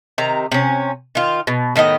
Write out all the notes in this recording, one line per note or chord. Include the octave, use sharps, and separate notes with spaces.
C3 D#3 A#5
C3 C#4
D#3 F4
B2
A2 D#3 B3 D#5